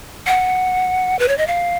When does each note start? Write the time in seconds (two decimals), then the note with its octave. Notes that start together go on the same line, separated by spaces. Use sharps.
0.27 F#5
1.19 B4
1.28 C#5
1.38 D#5
1.47 F5